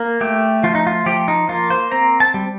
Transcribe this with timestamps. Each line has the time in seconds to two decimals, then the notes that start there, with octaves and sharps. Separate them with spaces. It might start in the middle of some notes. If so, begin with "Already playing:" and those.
Already playing: A#3
0.21 A3 G4
0.63 F3 F4
0.75 D#4
0.87 F4
1.06 F3 G4
1.28 D#4
1.49 A#3 F4
1.70 C5
1.92 C4 A#5
2.20 A5
2.34 G3